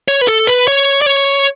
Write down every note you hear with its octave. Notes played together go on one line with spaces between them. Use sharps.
C#5
B4
A4
B4
C#5
D5
C#5